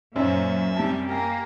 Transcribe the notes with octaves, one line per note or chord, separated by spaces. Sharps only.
F#2 A#2 F#3 C5 C#5 E5
C3 G3 G4 A5
A#3 G4 A#4 G5 G#5